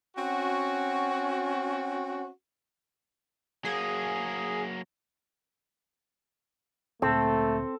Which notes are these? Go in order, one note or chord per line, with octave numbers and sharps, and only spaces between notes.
C4 C#4 F#4
F#3 A#3 G#4
D2 A#2 A3 C4 A4